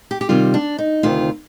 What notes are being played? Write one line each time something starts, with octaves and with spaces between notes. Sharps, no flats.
G4
G4
C3 D#3 G3 F4
D4
D#4
D2 C3 D#3 F4